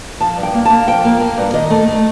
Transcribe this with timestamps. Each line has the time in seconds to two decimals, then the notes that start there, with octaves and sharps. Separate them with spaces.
0.20 F3 A5
0.37 G2
0.43 G5
0.54 A#3
0.65 A#3 A5
0.87 F3 G5
1.05 A#3
1.21 A#3
1.38 G2
1.53 D#3 D#5
1.70 A3
1.88 A3